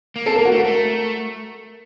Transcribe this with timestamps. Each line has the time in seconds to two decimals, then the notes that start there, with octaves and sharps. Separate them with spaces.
0.16 A#3
0.26 C4 A4
0.36 A#3 A#4
0.45 F#4
0.52 A3 A#4
0.65 A3